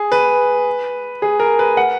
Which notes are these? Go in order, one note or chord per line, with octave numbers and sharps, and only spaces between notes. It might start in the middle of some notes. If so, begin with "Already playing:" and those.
Already playing: G#4
B4
G#4
A#4
B4
F#5